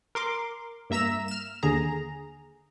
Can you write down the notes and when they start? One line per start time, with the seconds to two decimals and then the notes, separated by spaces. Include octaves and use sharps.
0.15 A#4 C6 D6
0.90 G2 A#3 E5 A#5 E6 E7
1.28 F6 E7
1.63 D#2 D3 G#4 A#5